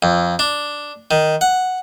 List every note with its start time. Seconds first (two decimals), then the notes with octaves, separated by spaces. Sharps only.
0.03 F2
0.39 D4
1.11 D#3
1.41 F#5